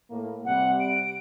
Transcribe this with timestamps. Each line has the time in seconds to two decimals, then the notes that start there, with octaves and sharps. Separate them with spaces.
0.10 A2 A#3
0.45 C3 G3 F#5
0.80 D7